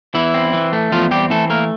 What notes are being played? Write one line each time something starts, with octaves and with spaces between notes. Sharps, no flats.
E2 E3 E4
C4
E3
A3
E2 F3 F4
G3 C4 G4
E3 A3 A4
A3 A#3 A#4